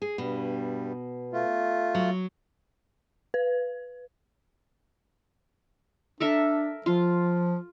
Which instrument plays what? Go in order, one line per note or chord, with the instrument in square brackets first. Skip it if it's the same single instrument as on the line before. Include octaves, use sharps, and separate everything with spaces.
[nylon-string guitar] G#4
[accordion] G2 G3 [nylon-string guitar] B2
[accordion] A3 F4
[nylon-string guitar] F#3
[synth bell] B4
[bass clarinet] D4 [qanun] A4 A#4 E5
[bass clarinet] F3 [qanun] F4